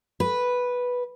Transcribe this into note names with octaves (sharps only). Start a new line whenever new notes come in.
B4